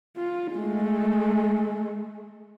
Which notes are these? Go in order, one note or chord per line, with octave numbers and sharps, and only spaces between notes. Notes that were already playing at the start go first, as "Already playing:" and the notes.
F4
G#3 A3